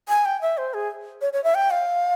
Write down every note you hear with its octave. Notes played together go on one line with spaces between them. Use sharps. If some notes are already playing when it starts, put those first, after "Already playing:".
G#5
G5
E5
C5
G#4
C#5
C#5
E5
G5
F5